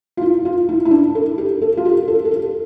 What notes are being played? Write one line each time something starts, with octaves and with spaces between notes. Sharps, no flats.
F4
E4
F4
E4
E4
D4
A4
G4
A4
F4
G4
A4
A4
G4